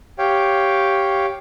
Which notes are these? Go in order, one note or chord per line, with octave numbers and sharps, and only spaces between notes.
G4 C#5 F5 G5